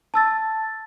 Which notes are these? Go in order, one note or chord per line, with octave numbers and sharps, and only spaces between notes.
A5 E6 A6